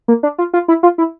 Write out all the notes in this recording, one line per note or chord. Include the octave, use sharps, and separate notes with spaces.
A#3
D4
F4
F4
E4
F4
E4